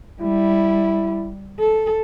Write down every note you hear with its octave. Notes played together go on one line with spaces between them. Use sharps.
G3 E4
A4